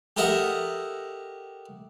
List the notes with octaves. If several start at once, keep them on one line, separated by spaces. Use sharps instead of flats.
G4 A4 A#4 D#5 E5 F#5